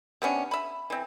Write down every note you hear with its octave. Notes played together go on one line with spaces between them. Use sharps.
C3 B3 C#4 D4
E5 B5
E3 C4